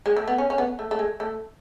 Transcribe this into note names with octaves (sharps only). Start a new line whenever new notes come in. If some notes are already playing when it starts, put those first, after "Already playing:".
G#3
A3
B3
C#4
C#4
B3
A3
A3
G#3
A3